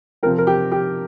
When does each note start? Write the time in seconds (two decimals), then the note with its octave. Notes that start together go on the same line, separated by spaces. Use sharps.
0.23 C3 F3 C4 A#4
0.38 A#4
0.47 G4
0.72 G4